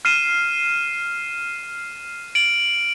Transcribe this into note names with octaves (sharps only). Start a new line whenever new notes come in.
F6 C7 D#7 E7
D7 F#7